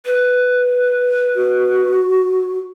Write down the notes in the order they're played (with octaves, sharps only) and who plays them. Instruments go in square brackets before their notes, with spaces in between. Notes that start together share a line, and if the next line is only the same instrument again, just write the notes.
[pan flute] B4
[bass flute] F#4